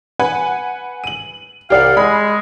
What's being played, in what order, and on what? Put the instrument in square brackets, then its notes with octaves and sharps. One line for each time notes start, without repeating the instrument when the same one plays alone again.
[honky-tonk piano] B4 F#5 G#5
D#7 F#7
[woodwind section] C2 F5 [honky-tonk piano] G4 D5 F#5
[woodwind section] G#3 [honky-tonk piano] B5